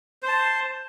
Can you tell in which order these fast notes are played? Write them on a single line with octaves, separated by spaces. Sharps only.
C5 C6 A5